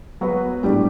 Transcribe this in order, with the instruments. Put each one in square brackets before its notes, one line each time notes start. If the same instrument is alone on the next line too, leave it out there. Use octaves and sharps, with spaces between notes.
[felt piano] F#3 B3 F#4 B4
A2 G3 D4 G4 D5